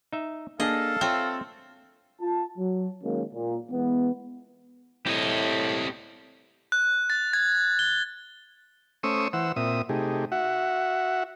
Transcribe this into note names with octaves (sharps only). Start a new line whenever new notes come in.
D#4 E5
A#3 D4 G#4 A4 D#5 F5
C4 F4 C#5 E5
F4 A5
F#3
D#3 F#3 G#3 A#3 C#4
A#2
E3 G#3 B3
A2 C4 E4 G4 D#5
F#6
A6
G#6
G7
A3 C#4 C5 C#6 D#6 E6
E3 C5 F#5 E6
A#2 C4 E5 D#6
C3 A3 D#4 G4 G#4
F#4 E5 F#5